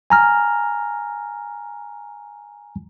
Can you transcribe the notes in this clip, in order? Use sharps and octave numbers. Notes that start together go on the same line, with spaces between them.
G#5 A#5 F6